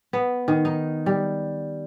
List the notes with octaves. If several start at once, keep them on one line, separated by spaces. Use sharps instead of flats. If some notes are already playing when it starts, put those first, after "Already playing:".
B3
D#3
D#4
G3